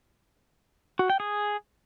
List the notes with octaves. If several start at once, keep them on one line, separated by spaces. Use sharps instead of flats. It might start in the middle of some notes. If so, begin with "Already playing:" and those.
F#4
G5
G#4